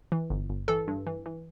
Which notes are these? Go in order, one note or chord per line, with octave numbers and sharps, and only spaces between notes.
E3
G1
G1
E3 A4
G2
E3
E3